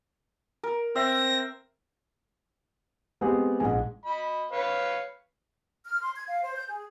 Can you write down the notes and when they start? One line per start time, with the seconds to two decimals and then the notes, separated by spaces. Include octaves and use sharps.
0.64 A#4
0.96 C4 E5 A#6
3.21 G#3 B3 C4 G4 G#4
3.60 A#1 G#2 G#3 G#5
4.05 D#5 B5
4.52 B4 C#5 F5
5.85 F6
6.01 C6
6.16 G#6
6.28 F5
6.42 C5
6.56 G6
6.68 G#4